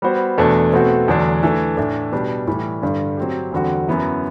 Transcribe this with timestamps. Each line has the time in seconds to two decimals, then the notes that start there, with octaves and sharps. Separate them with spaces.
0.02 G3 B3 F#4 C5
0.38 E2 B2 A3 D4 A4
0.73 B2 A3 C4 F#4
1.08 E2 D3 F#3 A3 D4
1.43 E3 A3 D4
1.77 A2 E3 A3 D4
2.12 B2 G3 D4 G4
2.47 A2 E3 G3
2.82 G2 D3 G3
3.17 F#3 C4 G4
3.52 E2 D3 G3 C4 F#4
3.88 F#2 F#3 B3 E4